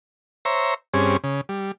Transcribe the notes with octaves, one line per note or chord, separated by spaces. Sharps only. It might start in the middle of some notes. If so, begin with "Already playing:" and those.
C5 C#5 E5 A#5
G2 C4 C#4 G#4
C#3
G3